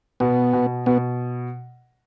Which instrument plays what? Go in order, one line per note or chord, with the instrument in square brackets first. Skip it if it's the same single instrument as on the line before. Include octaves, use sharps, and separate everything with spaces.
[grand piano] B2 [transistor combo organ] B3
[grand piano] B2
[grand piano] B2 [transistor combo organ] B3